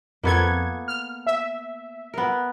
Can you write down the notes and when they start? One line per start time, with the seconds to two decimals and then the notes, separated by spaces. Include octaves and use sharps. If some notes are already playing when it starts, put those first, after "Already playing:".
0.23 F2 A#3 B3 A4 G#6
0.88 F6
1.27 E5
2.14 B3 A#4